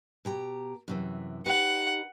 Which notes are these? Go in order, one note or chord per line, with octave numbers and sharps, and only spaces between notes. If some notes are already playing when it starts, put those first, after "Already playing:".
B2 G4 A#5
F#2 C3 E3
D#4 G4 B4 F#5